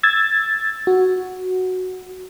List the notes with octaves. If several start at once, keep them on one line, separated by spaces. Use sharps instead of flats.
E6 G#6 A6
F#4